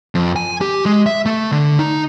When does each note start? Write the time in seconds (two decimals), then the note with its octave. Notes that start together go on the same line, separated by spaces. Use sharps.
0.15 F2
0.36 G#5
0.61 G4
0.86 G#3
1.06 E5
1.26 A3
1.52 D3
1.79 D#4